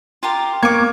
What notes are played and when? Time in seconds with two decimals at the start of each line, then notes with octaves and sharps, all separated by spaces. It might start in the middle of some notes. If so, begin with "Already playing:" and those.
0.23 F4 G4 A#4
0.63 A#3 C#6 D6 G#6